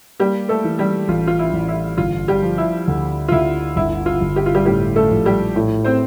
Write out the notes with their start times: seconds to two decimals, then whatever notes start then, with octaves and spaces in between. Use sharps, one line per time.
0.20 G3 A#3 G4
0.49 A3 A4
0.64 E3
0.79 G3 G4
1.08 A1 F4
1.27 F4
1.39 E4
1.53 A1
1.68 E4
1.97 G1 F4
2.28 G3 G4
2.43 F3
2.58 E4
2.88 D2
3.28 F4
3.32 D2 E4
3.76 G1 E4
4.06 F4
4.21 G1
4.36 G4
4.46 F4
4.55 G3 G4
4.65 A2 G3 G4
4.96 A3 A4
5.11 A#1
5.25 G3 G4
5.56 A2
5.84 C4 C5